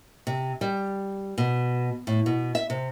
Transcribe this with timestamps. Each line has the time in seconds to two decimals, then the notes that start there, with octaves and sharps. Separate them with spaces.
0.27 C3
0.61 G3
1.38 B2
2.07 A2
2.26 B2
2.55 E5
2.70 C3